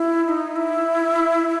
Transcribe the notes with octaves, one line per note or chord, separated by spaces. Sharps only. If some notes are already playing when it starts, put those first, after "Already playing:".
Already playing: E4
E4
D#4
E4